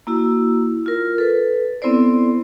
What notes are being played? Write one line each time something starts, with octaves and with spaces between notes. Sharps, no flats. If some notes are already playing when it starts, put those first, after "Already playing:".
A#3 E4 F#4 E6
F4 A#4
A4 B4
B3 C4 E4 A4 C5 D5